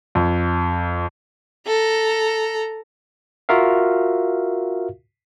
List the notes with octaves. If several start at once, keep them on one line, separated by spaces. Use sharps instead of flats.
F2
A4 A#5
F4 F#4 A#4 E5 F5